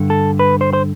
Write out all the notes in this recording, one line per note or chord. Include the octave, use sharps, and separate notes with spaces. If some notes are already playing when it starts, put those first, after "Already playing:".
Already playing: G2 D3
A4
B4
C5
C5